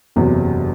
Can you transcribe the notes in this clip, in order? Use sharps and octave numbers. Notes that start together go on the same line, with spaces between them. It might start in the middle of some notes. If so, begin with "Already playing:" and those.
F#1 E2 C3 F#3